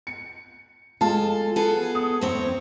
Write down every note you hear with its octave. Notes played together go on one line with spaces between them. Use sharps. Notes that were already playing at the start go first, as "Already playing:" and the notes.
C#7
G#3 F4 A4 A5
B3 G#4 A4
D#6
E2 C4 C#5